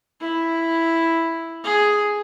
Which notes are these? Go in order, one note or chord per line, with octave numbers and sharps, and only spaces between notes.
E4
G#4